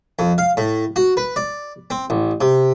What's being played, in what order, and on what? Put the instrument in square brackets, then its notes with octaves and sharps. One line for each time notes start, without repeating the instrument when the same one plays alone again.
[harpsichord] F2
F5
A2
F#4
B4
D5
C4
A1
C3